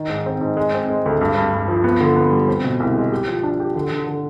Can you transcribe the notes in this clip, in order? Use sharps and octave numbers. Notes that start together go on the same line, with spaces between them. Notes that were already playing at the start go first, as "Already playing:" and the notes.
Already playing: D#3
G#2
C4
G#2
G#3
C4
G#3
D2
G2
G2
G2
F3
B3
D3
B3
G3
C4
B2
C2
G#3
G4
F3
D4
G4
D3
D3
D3